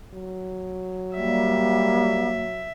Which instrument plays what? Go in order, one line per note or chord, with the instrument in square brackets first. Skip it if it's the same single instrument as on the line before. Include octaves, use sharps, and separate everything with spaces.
[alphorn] F#3
[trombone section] G3 [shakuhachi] A#3 [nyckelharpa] E5